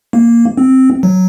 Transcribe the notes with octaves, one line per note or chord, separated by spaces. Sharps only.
A#3
C4
F#3